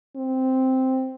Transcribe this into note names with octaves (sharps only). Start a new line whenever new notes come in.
C4